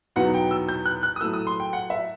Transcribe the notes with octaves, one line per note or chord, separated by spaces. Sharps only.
E2 B2 F#3 B3 D#4 F#5
G5
E6
G6
F#6
F#6
D#6
A2 F#3 A3 E6
D#6
C6
G5
F#5
E5